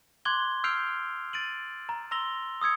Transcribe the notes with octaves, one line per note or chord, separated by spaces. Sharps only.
C6 D6 F#6 G#6 G7
E6 F6 G6 C7 D7 F7
A6 D7 D#7 F#7
A#5
A#5 C6 E6 A#6 F7 G7
D#6 E6 G#6 C#7